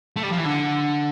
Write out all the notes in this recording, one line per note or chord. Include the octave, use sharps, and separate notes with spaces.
A3
G3
F3
E3
D3